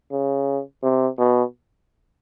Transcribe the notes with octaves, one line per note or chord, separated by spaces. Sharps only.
C#3
C3
B2